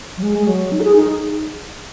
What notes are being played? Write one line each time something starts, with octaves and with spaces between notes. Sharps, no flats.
F#3
G#3
G#3
F#3
D#4
A4
G#4
D#4